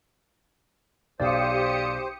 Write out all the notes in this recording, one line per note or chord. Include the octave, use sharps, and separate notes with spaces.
B1 G4 C5 D5 F5 D#6 C#7